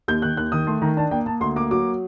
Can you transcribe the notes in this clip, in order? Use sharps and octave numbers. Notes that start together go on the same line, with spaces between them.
D#2 G6
D#3 F#6
D#2 F#6
D#3 D#6
A3 C6
D#3 A#5
D4 A5
A#3 G5
A#3 A5
D2 C6
A#3 D6
F#3 D6